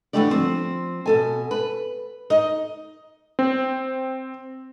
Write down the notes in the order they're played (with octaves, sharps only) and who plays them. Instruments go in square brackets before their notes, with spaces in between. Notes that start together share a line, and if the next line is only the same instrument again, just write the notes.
[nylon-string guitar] D3 E3 G3 A3 G4 D5
F3 C4
B2 A4 G#5
B4
D#4 D#5
[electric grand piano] C4